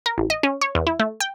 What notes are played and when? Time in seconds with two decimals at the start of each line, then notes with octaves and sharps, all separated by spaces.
0.06 A#4
0.18 A1
0.30 D#5
0.43 C#4
0.61 C#5
0.75 E2
0.87 E4
0.99 A3
1.20 G5